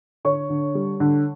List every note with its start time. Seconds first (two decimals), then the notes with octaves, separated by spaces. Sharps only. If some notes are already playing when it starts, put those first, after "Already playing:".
0.25 D3 C#5 C#6
0.50 D3
0.75 G3
1.00 D3